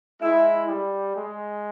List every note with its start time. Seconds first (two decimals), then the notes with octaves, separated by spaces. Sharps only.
0.21 G#3 E4
0.69 G3
1.16 G#3